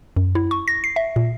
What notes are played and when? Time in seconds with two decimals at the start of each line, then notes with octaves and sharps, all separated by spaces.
0.17 F#2
0.35 E4
0.51 C#6
0.68 A#6
0.84 C7
0.96 E5
1.16 A#2